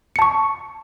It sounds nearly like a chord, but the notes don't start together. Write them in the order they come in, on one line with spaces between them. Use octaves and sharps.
C#7 A5 C#6